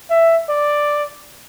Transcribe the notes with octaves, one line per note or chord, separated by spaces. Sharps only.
E5
D5